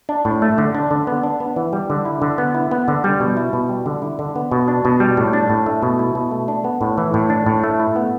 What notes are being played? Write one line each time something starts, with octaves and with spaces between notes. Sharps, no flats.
D4
A2
A3
D3
D4
D3
B3
D4
B3
E3
G3
D3
E4
D3
B3
E4
B3
D3
G3
B2
E4
B2
G3
D3
E4
D3
B3
B2
D4
B2
G3
A2
D4
A2
A3
B2
E4
B2
A3
D4
B3
A2
E3
A2
D4
A2
A3
E4
B3